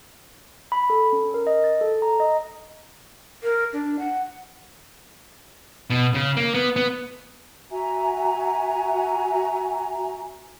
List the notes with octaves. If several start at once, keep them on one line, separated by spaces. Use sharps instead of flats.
B5
A4
C#4
A#4
D#5
A6
A4
A#5
D#5
A#4
D4
F#5
B2
C#3
A#3
B3
B3
F#4 E5 G#5 A#5